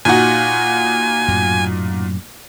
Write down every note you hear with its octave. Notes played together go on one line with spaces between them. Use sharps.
A#2 D#4 F#4 G#5
F#2 A2 F#3